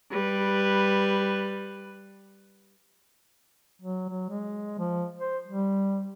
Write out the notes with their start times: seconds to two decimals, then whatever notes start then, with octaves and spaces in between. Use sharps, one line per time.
0.11 G3 B4
3.82 F#3
4.09 F#3
4.29 G#3
4.79 F3
5.19 C5
5.47 G3